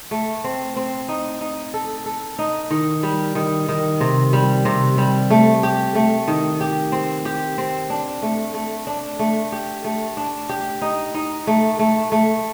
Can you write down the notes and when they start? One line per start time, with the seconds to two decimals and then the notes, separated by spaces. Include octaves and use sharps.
0.11 A3
0.44 C4
0.76 C4
1.08 D#4
1.41 D#4
1.74 A4
2.06 A4
2.39 D#4
2.71 D#3
3.03 G3
3.35 D#3
3.68 D#3
4.00 C3
4.33 G3
4.65 C3
4.98 G3
5.30 A3
5.63 G4
5.95 A3
6.28 D#3
6.61 G4
6.92 C4
7.25 G4
7.58 C4
7.90 D4
8.22 A3
8.54 A3
8.87 D4
9.19 A3
9.52 G4
9.84 A3
10.17 D4
10.49 G4
10.82 D#4
11.15 D#4
11.47 A3
11.79 A3
12.12 A3